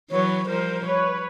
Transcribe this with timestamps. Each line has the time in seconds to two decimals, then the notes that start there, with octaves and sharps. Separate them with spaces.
0.11 E3 F#3 B4 C#5
0.49 F3 G3 A#4 C5
0.85 B4 C#5